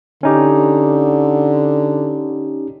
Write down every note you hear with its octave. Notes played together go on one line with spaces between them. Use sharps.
D3 C#4 D#4 G4